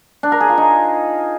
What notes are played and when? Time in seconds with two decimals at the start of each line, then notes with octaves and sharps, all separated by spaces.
0.23 D4
0.32 A#4
0.40 G#4
0.49 F4
0.58 D#4